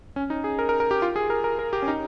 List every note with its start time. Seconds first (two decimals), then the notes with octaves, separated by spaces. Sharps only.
0.16 C#4
0.30 D#4
0.44 G#4
0.59 A#4
0.69 A#4
0.80 A#4
0.91 G4
1.02 F4
1.16 G#4
1.30 A#4
1.44 A#4
1.59 A#4
1.73 G4
1.82 C#4
1.88 D#4